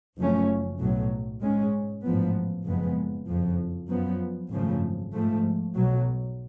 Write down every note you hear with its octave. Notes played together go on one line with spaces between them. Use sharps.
F#1 F#2 F3 A3 C#4
B1 A2 F#3
G#2 G#3 C#4
A1 G#2 F3 B3
F#1 F2 F3 G#3 B3
F#1 F2 F3
F#2 F3 B3
G#1 F#2 C#3 F3 A3
G#2 F3 A3
B1 B2 F#3